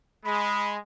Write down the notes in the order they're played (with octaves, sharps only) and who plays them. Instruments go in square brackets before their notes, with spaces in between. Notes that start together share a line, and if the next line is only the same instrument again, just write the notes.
[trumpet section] G#3 [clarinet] B5